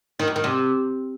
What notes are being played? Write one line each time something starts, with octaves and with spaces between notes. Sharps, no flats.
D#3
E2
D#3
C3